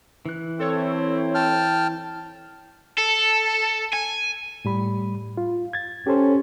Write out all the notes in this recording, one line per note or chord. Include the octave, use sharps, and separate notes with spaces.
E3 F#6
C4 E4 A4 C#5
G5 A5 F6
A4
G#5
A2 G3 B5
F4
G#6 A6
C#4 G4 A4 C5